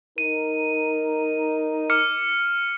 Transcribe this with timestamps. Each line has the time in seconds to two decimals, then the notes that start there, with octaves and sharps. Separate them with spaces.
0.18 D#4 A#4 D#7
1.90 D6 F6 C#7